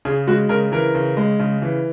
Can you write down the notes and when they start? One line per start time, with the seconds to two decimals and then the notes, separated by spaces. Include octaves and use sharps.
0.05 C#3 G#4
0.27 G#3 F#4
0.49 C#3 A#4
0.72 E3 A#4
0.95 C#3
1.17 G#3
1.39 C#3
1.62 E3